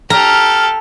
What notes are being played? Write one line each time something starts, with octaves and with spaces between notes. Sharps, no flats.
G4 A4 A#5 F6